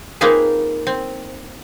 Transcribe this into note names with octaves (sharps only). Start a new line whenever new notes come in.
A#3 C4 D#4 F4 G#4 B4
C4